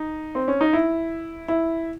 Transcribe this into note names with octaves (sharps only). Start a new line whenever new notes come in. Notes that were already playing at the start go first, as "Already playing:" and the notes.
Already playing: D#4
C4
C#4
D#4
E4
E4